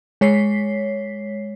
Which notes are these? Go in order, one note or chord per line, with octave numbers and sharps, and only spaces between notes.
G#3 C#5 B6 C7